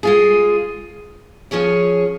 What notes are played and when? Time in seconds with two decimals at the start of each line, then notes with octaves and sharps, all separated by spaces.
0.03 G#3 F4 G#4
1.51 F3 C#4 G#4 C#5